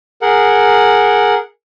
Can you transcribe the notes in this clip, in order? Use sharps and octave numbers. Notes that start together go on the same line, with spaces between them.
G#4 A#4 F#5